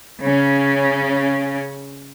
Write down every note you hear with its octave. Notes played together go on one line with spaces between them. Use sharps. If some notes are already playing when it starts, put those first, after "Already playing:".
C#3 C#4